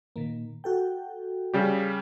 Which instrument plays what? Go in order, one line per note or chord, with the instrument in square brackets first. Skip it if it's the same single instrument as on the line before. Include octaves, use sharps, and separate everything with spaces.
[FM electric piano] A#2 D#3 A#3
F#4 A4 G5
[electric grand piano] C#3 G3 G4